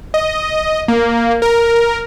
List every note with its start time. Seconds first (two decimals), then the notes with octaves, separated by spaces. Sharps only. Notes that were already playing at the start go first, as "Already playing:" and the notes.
0.14 D#5
0.88 A#3
1.42 A#4